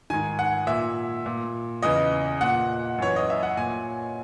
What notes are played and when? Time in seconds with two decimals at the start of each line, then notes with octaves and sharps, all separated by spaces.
0.10 G#2 D#3 G#5
0.39 F#5
0.67 A#2 E5
1.26 A#2
1.83 E2 C#3 E3 D#5
2.41 A#2 F#5
2.98 F#2 E3 C#5
3.16 D#5
3.30 E5
3.43 F#5
3.57 A#2 G#5